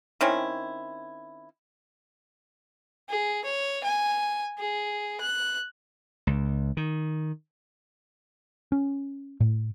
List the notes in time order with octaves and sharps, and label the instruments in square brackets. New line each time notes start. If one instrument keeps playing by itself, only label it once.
[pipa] D#3 C4 C#4 E4
[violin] G#4
C#5
G#5
G#4
F#6
[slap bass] C#2
D#3
[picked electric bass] C#4
A2